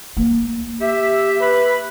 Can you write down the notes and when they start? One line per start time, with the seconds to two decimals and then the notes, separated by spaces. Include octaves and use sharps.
0.17 A#3
0.80 G4 E5
1.41 B4 B5